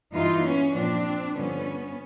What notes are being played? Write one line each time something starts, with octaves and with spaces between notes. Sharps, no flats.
G2 E3 D#4 F4
B3 C#4
A#2 F3 C4 D4
G2 D3 F3 B3 C#4